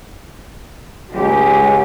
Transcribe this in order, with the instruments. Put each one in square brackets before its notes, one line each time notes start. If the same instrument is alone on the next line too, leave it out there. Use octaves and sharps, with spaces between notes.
[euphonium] C#2 [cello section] G#3 G4